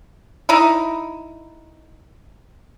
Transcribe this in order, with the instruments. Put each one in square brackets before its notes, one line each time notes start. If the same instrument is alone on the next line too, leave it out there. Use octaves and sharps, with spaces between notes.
[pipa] D#4 E4